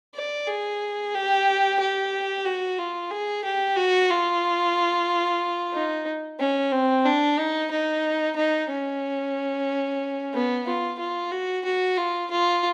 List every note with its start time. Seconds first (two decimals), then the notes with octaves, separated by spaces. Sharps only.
0.15 D5
0.48 G#4
1.14 G4
1.80 G4
2.45 F#4
2.78 F4
3.11 G#4
3.44 G4
3.76 F#4
4.09 F4
5.74 D#4
6.40 C#4
6.72 C4
7.05 D4
7.38 D#4
7.71 D#4
8.36 D#4
8.69 C#4
10.34 B3
10.66 F4
10.99 F4
11.32 F#4
11.65 F#4
11.98 F4
12.31 F4